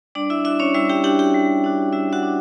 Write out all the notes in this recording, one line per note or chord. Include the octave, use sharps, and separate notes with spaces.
G3 D4 D5
E4 E5
D4 E4 F#4 E5
C#4 C#5
G3 E4 E5
G4 G5
D4 F#4 G4 G5
G4 G5
G3
D4 F#4
G3 E4 E5
F#4 F#5
D4